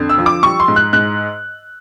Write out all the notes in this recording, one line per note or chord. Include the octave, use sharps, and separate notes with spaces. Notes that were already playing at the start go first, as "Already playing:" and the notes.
Already playing: F2 D3
E6
F3
D6
G3 C#6
C6
G#2
F#6
G#2 F#6